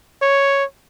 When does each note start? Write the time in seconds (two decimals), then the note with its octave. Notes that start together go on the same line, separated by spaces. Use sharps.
0.22 C#5